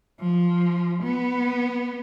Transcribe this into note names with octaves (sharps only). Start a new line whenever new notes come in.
F3
B3